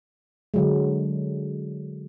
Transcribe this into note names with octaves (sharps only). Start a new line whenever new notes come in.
D3 F#3 G#3